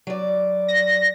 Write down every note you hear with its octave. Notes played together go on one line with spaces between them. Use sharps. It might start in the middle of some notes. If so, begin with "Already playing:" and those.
F#3 D5
A#6